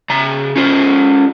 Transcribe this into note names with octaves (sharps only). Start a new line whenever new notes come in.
C#3 A#5
C#4 F4 C5